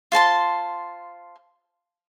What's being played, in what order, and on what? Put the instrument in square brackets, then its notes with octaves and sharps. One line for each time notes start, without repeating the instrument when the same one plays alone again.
[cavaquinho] F4 C5 A5 C6